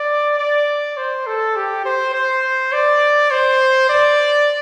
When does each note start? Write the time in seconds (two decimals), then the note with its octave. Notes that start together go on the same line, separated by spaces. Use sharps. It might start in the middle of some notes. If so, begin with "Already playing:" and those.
Already playing: D5
0.38 D5
0.97 C5
1.27 A4
1.56 G4
1.85 C5
2.14 C5
2.72 D5
3.31 C5
3.89 D5